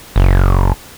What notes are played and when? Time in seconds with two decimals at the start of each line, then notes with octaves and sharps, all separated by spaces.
0.16 F#1